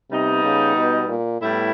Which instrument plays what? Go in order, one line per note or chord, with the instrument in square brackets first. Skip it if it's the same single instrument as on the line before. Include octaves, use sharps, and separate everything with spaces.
[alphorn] C3 [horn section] G3 B3 D#4
[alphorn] C#3
B2
A#2
[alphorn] A2 [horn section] G3 B3 E4